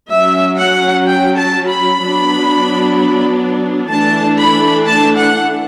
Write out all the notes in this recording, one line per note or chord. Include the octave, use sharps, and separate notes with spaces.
F#3 C#4 E5
F#5
G5
A5
B5
F#3 B3 D4
E3 A3 D4 A5
B5
A5
F#5